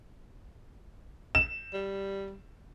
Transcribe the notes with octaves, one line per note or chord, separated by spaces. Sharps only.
E7
G3